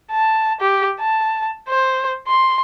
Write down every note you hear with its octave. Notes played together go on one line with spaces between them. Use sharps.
A5
G4
A5
C5
C6